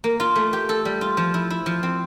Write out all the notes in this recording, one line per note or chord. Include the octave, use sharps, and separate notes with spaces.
A#3
F4
A3
G4
A4
G3
F4
F3
E4
E4
F3
C4